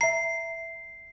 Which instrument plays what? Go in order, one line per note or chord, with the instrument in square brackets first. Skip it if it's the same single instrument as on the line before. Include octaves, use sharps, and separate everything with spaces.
[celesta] E5 A#5 [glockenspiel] C7